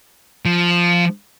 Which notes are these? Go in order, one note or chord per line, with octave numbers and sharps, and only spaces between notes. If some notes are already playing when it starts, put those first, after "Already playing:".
F3